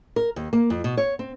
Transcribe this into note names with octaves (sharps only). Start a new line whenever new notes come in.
A#4
D#2
A#3
F2
B2
C#5
C4